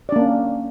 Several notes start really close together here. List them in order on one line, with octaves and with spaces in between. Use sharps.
D5 D4 A#3 C#4